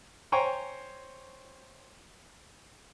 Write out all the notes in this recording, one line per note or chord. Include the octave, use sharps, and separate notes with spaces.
C5 C#5 G5 G#5 A#5 C#6